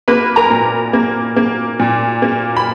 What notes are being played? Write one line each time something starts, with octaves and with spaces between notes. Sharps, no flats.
A#3 B4 B5
A#4 A#5
A#2
A#3
A#3
A#2
A#3
B5